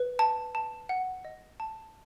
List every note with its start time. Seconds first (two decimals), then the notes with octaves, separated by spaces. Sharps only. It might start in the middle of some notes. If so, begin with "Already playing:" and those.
Already playing: B4
0.19 A5
0.55 A5
0.89 F#5
1.25 D#5
1.60 A5